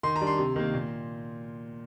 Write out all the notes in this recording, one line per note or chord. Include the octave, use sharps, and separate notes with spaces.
D#3 C6
A#5
G3 D4
C6
C3
D#3 A#3
A#2